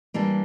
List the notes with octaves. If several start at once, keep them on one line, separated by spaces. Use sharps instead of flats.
E3 G3 A#3 D4